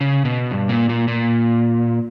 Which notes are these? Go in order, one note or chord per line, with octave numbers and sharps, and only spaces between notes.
C#3
B2
G2
A#2
A#2
A#2